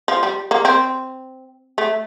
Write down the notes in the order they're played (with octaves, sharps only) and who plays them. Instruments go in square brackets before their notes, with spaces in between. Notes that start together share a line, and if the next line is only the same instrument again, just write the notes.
[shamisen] F3
G3
A#3
C4
A3